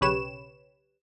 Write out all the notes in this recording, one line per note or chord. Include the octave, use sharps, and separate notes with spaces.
B1 C#3 G4 B4 C#5 E7